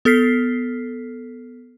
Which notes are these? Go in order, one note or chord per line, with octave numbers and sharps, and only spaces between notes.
B3 A4 F6 B6 C7